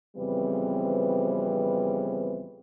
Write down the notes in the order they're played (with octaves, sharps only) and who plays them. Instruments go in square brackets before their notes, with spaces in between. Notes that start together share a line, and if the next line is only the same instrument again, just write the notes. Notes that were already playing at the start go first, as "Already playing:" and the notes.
[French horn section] F2 C#3 E3 G3 B3 C4